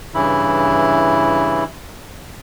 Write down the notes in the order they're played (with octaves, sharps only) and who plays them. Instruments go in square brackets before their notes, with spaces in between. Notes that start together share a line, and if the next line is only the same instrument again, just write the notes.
[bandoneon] G2 C#3 E3 E4